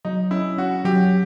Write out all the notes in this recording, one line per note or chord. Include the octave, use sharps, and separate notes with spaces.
F#3 D#4
C#4 E4
C#4 F#4
F#3 G4